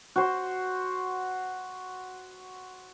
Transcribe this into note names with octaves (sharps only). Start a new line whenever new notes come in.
F#4 C5